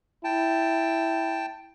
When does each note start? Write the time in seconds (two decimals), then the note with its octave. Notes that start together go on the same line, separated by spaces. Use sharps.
0.24 E4 G5 A5